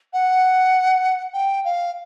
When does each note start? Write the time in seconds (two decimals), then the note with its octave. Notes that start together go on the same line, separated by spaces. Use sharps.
0.13 F#5
1.33 G5
1.65 F5